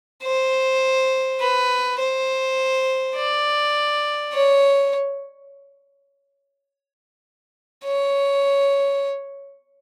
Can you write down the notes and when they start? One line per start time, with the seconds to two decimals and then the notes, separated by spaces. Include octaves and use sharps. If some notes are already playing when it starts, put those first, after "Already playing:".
0.23 C5
1.40 B4
1.99 C5
3.16 D5
4.33 C#5
7.85 C#5